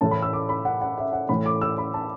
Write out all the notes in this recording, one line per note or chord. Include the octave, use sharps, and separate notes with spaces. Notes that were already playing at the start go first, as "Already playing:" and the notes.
A2 E3 A3 A5
B5
E6
D6
B5
F#5
F#5
E5
F#5
A2 E3 A3 B5
D6
E6
B5
A5